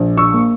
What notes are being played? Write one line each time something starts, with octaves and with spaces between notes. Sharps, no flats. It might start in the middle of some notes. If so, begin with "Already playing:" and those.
Already playing: A#1
C#6 E6
A#3